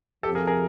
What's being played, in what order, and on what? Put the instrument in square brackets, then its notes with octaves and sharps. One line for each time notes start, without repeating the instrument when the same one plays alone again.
[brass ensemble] F2 C3 F3 [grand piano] G4 A4
[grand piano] G#4 A#4
G#4 A#4